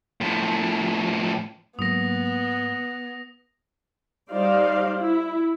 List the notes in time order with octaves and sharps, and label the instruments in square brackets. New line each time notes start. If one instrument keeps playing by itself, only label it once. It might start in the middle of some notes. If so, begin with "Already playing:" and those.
[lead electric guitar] A2 F3
[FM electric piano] G#2 F#3 A#3 [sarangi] B3 [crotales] D#6 A#6
[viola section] G3 D#4 C5 D5 F5
E4